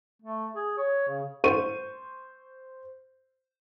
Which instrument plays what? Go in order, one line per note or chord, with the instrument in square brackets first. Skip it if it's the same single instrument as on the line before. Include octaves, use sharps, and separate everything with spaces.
[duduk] A3
G#4
C#5
C#3
[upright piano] C5 C#6 D#7